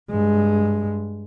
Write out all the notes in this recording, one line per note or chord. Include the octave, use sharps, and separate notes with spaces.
G2 G#3